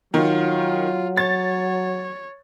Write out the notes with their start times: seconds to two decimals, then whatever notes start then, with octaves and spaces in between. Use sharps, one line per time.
0.14 D#3 F#3 F4
1.17 C#5 A6